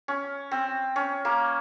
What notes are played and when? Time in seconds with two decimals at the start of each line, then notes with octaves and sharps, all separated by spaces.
0.08 C#4
0.51 C4
0.96 C#4
1.25 A#3